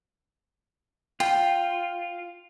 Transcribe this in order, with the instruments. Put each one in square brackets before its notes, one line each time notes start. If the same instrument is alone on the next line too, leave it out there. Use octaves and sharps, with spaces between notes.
[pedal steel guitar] F4 [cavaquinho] G5